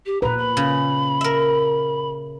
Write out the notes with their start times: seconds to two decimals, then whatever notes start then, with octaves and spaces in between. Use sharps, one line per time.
0.06 G4
0.22 A#2 B4 A#5
0.38 B5
0.57 C#3
1.21 A#4 E5